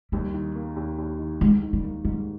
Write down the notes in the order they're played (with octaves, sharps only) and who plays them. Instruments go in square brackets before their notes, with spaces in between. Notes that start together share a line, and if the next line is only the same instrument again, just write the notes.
[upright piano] D#2 [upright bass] G3
[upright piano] D#3
A#3
D#2
D#2
D#3
[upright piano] G#2 [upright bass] G#3
[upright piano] D#3
[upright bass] G3
[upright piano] A#3
[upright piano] G#2 [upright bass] G3